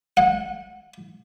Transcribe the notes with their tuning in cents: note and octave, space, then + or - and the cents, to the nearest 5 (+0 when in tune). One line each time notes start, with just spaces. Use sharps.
F#5 -25